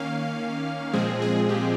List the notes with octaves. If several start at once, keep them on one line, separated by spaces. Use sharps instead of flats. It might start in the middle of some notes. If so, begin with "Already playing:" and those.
Already playing: D#3 A#3 C#4 F5
A#2 F3 G#3 C4 G#4
G#4
G4